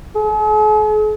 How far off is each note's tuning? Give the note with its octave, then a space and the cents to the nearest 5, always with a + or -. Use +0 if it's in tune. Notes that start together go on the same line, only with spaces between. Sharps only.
G#4 +45